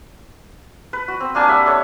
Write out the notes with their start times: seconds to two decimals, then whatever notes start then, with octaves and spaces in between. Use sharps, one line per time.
0.93 B4
1.08 F#4
1.20 C4
1.35 A#3 D4 G#5 A5
1.48 G3 E5 F#5
1.66 A4 C#5